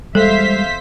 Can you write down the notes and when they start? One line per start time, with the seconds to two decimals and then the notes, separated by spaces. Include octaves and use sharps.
0.15 E2 G3 G#3 A4 C5 E5 F5 B6